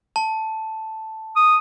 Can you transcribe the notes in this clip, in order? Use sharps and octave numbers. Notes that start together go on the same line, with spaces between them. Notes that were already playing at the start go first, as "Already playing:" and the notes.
A5
D#6